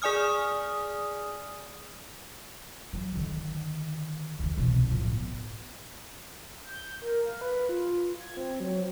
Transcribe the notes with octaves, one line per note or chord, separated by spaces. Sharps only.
G#4 D5 G#5 D#6 F6
E3 F#3
D3 D#3
C#2 E3
C2 B2
A2 F3
B3
G6
A#4
F5
B4
F4
G#6
C4
F#3